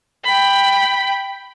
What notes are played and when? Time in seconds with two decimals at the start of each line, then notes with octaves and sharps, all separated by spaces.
0.24 G5 B5